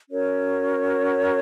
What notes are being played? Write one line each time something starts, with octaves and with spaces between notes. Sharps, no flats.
C#4 F#4 A#4 C#5